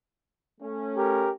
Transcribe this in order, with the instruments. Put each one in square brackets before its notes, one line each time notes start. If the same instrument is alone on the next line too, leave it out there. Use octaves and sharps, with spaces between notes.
[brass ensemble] A3 C#4
[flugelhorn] G4 [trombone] A#4